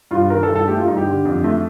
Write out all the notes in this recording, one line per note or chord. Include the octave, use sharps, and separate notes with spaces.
G2 F4
D#3 A#4
A4
G2
A4
A3 G4
F4
G2 D#4
G4
D3
F2
A3